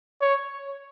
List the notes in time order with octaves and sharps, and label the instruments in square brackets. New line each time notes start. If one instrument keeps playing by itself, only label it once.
[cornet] C#5